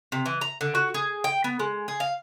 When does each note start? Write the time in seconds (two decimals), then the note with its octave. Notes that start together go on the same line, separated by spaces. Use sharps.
0.12 C3
0.26 E3
0.41 A#5
0.61 D3
0.75 F#4
0.94 G#4
1.24 G5
1.44 B3
1.59 G#3
1.88 G#4
2.00 F5